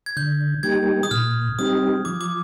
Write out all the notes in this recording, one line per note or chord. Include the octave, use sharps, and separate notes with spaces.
G#6
D3 G6
G3 A#3 D#4 G4 G#6
D#6
A#2 F6
G3 C4 D#4 G4 D#6
F3 D6
D6